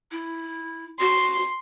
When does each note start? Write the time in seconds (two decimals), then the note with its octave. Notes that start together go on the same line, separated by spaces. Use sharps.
0.12 E4
1.00 F#4 C6